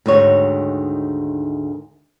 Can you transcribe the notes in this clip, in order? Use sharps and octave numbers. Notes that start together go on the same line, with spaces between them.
D2 G#2 D#3 C#5